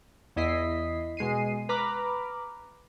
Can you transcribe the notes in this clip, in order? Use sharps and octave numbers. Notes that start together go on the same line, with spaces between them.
E2 E4 D#5 B6 C7
B2 G#3 C7 D#7
B4 A#5 B5 D6 F6